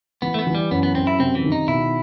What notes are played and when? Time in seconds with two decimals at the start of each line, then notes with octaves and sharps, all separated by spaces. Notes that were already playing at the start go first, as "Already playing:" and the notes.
0.22 E3 B3
0.34 A3
0.39 B3
0.47 E3
0.55 G3
0.71 F#2 B3
0.83 B3
0.95 F#2 C4
1.07 E4
1.19 C3 C4
1.35 E3
1.44 D#3
1.52 D#4
1.68 B2 E4